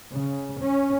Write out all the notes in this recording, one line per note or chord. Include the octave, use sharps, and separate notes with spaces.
C#3
C#4